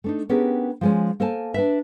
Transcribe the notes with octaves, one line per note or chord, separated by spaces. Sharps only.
A3 D4 D#4
B3 C#4 D4 G4 G#4 A#4
F3 G#3 C#4
A#3 A4 C5 G#5 A5
D4 B4 E5